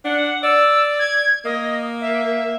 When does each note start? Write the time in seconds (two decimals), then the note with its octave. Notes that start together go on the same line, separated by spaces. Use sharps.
0.04 D4 F#5
0.43 D5 E6
0.99 G#6
1.45 A#3 D#5
2.01 E5